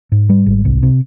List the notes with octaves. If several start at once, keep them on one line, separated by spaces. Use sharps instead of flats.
G#2
G3
G#1
C2
C3